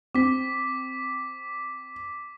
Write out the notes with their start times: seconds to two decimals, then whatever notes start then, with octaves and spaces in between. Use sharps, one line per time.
0.15 C4 D6 B6